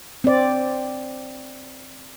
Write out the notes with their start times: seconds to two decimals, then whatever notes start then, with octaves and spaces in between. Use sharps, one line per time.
0.24 C4 D5